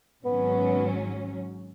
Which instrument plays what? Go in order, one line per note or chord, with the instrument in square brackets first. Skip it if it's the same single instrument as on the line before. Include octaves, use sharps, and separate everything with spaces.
[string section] G#1 G#2 F#3 C#4 [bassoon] B3